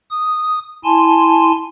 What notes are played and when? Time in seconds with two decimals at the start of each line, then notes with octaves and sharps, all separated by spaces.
0.11 D#6
0.84 E4 G#5 A5 C6